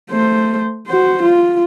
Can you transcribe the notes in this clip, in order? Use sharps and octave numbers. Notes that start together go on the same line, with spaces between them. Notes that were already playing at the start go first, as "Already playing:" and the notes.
A3 C5
F#4 C5
F4